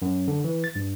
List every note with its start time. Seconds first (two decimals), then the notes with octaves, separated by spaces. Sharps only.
0.02 F#2
0.28 D3
0.44 E3
0.64 A6
0.75 G2